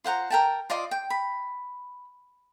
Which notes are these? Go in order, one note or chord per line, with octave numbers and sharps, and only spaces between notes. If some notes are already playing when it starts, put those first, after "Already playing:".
F4 C5 F#5 A#5
A#4 G5 A5
F4 D5 D#5 C6
G5
B5